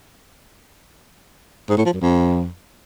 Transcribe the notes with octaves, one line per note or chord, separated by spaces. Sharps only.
G#2
A2
F3
F#2
F2